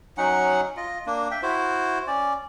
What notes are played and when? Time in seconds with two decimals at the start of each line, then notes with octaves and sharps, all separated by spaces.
0.18 F#3 C#4 D#4 F#5
0.77 F4 D#5
1.07 A#3 D4
1.31 E5 G5
1.43 E4 F#4 C5
2.07 C#4 D5